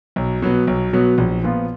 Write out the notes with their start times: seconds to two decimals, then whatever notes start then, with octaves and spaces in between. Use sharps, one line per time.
0.16 B1
0.42 B2 F#3 B3
0.67 B1
0.93 B2 F#3 B3
1.18 A#1
1.43 A#2 F3 B3 F4